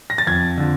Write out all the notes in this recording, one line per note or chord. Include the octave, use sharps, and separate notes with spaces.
A#6
A6
F2 G#6
D3 F3